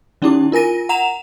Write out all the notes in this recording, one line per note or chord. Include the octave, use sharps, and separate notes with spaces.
D#3 C#4 D#4 E4 G4 D6
F4 A#4 G#5 A#6 D#7
F#5 A#5 E7 F7